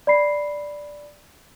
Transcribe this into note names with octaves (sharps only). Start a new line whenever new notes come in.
D5 B5 C7